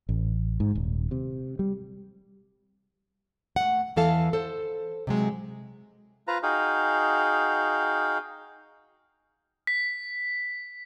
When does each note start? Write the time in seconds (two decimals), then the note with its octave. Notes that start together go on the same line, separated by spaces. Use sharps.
0.09 A1
0.60 G#2
0.75 D#1
1.11 C3
1.59 G3
3.56 A3 F#5
3.96 E2 E3 A4 F5 A5
4.33 A4 C5
5.07 C3 F#3 G#3
6.28 F4 B4 C5 A#5
6.43 D#4 F#4 G#4 F5 G5
9.67 B6